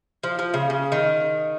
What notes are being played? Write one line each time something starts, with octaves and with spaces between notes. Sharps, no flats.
F3
F3
C#3
C#3
D#3